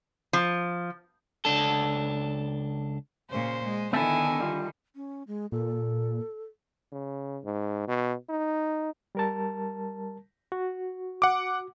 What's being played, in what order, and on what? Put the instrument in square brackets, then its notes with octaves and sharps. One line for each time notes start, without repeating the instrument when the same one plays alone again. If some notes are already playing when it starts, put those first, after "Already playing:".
[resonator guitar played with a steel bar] F3
[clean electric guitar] C#2 D4 A4
[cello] A#2 C#3 [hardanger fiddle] C5
[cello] G#3
[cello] D3 D#3 [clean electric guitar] B3 E5 A5 [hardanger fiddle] E4 G#5
[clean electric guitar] G3 F4
[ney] C#4
G#3
[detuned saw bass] A#2 [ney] A4
[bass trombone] C#3
G#2
B2
D#4
[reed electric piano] G3 A#4 A5
F#4
[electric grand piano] F#5 D6